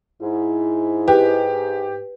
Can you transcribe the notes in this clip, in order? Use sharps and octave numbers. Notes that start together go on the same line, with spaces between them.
G#2 E4
G4 B4